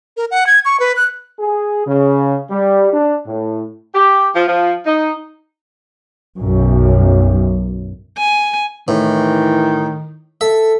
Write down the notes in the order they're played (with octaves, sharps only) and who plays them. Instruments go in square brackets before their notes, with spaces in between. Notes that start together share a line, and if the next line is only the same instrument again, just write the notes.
[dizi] A#4
F#5
G#6
C#6
B4
F#6
[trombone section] G#4
C#3
G3
D4
A2
[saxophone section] G4
F3
F3
D#4
[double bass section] B1 F#2
[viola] G#5
[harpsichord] A2 [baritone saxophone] D#3 [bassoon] E3
[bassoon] A4 [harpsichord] E5